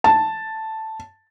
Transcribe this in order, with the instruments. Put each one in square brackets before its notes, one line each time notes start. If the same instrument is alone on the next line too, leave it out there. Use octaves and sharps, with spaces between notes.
[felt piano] A5